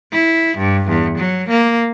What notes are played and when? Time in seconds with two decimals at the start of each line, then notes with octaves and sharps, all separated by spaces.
0.13 E4
0.58 G2
0.89 E2
1.18 F#3
1.49 A#3